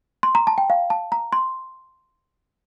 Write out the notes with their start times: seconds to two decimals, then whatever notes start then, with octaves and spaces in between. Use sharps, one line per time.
0.23 C6
0.35 A#5
0.47 A5
0.58 G5
0.70 F5
0.90 A5
1.12 A#5
1.33 C6